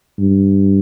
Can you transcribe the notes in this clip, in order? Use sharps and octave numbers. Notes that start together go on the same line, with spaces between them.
G2